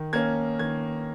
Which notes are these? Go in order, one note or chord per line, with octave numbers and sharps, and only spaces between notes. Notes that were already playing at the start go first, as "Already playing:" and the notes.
Already playing: D#3
A#3 C#4 G#6
D#3 G#6